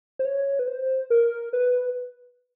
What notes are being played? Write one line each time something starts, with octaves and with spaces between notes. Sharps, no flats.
C5
C#5
B4
C5
A#4
B4